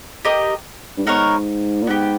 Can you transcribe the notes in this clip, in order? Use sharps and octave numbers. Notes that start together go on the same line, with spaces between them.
G4 A#4 D#5
G2
G#2 B3 D#4 A#4 C#5
A#2
G#2 B3 D#4 G4